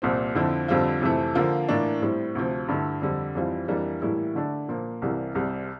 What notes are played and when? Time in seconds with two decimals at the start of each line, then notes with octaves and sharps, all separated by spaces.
0.02 C2 A#2 F3 C4
0.35 F2 D3 F3 C4 E4
0.68 F2 D3 G3 C4 F4
1.02 F2 C3 E3 A3
1.35 D3 F3 A#3 F4
1.69 A2 E3 A#3 D4
2.02 A2 G3 C4 E4
2.35 D2 C3 F3
2.68 G2 D3 A3 E4
3.02 F2 D3 G3
3.35 F2 E3 G3 C4 F4
3.68 F2 E3 G3 A#3 D4
4.02 A2 E3 G3 A#3 E4
4.35 D3 A3 D4
4.69 A#2 F3 A#3
5.02 C2 C3 E3 G3 A#3
5.35 C2 C3 G3